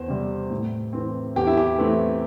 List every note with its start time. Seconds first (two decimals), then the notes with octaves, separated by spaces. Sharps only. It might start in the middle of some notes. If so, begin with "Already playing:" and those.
Already playing: E2 C5
0.08 C3 G3 C4
0.50 A2
0.93 E3 C4
1.36 E2 G4
1.47 E4
1.57 G4
1.78 E3 A3 C4